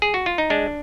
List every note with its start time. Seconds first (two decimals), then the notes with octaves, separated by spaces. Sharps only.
0.02 G#4
0.14 F#4
0.26 F4
0.38 D#4
0.50 G#3 D4